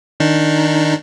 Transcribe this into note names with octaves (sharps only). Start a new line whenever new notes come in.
D#3 D4 D#4